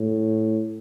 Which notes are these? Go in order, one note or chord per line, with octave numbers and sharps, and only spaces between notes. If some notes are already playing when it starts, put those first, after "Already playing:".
Already playing: A2